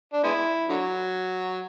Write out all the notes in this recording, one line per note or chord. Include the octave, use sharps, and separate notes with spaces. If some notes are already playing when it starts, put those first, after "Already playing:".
D4
G#3 B3 E4
D3 F#3